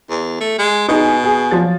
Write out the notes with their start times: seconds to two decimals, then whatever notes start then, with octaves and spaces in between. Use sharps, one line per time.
0.10 E2
0.41 A3
0.59 G#3
0.89 B2 D#4 G#4 G#5
1.24 G#4
1.51 F3 F#3 A6